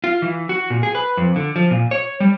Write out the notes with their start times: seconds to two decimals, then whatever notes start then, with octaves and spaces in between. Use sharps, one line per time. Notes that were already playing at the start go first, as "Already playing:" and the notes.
0.04 F4
0.22 E3
0.49 F#4
0.70 A#2
0.83 G#4
0.95 B4
1.17 F2
1.36 D3
1.56 F3
1.71 A#2
1.91 C#5
2.20 G3